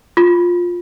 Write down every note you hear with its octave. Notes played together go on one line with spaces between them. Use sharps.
F4